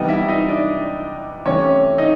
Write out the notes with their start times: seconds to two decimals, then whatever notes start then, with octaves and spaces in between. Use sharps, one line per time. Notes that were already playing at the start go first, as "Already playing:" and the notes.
Already playing: C3 E3 G3 B3 D#4 D#5
0.08 E4 E5
0.28 D#4 D#5
0.48 D4 D5
1.46 C3 E3 A3 C#4 C#5
1.98 D#4 D#5